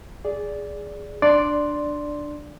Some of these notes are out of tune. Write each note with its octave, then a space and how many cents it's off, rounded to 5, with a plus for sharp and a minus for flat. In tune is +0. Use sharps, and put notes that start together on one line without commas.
G#4 +0 D5 -10
D4 +10 D5 +0 C6 +0